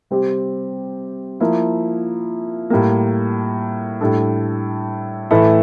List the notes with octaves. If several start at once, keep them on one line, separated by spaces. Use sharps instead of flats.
C3 G3 C4 G4
F3 A#3 E4
A2 G3 A#3
A2 G3 D4 A4
A2 E3 A3 E4 A4